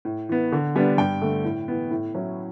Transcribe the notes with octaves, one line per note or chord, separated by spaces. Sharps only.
A2
E3 B3
D3
G3 B3 D4
G2 G5
D3 A3
A2
E3 B3
A2
F#3 C#4 E4